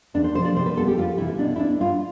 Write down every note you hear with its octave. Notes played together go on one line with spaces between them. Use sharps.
E2 D4
C5
C3 F3 C5
D5
C3 C5
B4
G3 B3 A4
G4
F2 F4
C3 E3 E4
B2 D4
E4
B3 D4
G2 F4